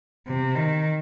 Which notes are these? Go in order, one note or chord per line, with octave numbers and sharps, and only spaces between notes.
C3
D#3